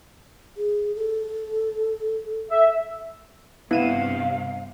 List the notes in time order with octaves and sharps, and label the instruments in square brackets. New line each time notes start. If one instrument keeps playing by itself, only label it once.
[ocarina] G#4
A4
[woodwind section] E5
[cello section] G2 C3 [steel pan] B3 [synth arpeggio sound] E4 D#7 E7 [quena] F5